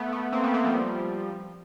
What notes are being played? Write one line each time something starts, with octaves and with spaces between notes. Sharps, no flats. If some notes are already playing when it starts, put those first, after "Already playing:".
Already playing: A3 B3
A3 B3
A#3 C4
A3 B3
A#3 C4
F3 G3